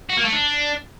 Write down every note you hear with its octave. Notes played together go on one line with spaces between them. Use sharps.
F#4
A#3
A3
D4